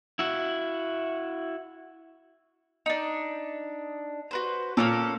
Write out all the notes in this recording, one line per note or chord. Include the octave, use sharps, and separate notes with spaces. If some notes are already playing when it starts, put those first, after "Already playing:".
E4 F#4
D4 D#4
F#4 B4 C5
A#2 A#3 C#4 A4